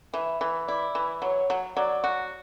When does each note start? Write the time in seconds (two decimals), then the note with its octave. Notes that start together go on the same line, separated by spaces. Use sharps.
0.13 E3 E5
0.41 E3
0.67 E4 D5
0.95 E3
1.22 F#3 C#5
1.50 F#3
1.76 F#3 D5
2.04 F#4